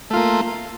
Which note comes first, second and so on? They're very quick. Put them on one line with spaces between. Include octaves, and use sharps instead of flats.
A3 F4 A#3